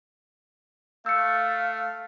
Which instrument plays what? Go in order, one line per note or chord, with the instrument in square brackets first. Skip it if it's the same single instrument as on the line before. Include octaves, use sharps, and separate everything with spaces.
[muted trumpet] A3 [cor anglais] F5 [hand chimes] E6 C#7